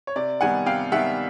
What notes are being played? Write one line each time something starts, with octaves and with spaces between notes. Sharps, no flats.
C#5
C3 D5
D#3 G3 B3 F#5 G#5
C3 F5 G5
D#3 G3 B3 E5 F#5